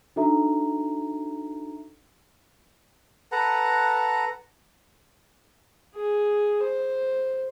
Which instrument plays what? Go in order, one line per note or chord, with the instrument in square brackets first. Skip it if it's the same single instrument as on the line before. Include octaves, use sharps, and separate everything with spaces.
[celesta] D4 D#4 F#4 A4 E5 A#5
[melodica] A4 B4 F#5 A#5
[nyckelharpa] G#4
C5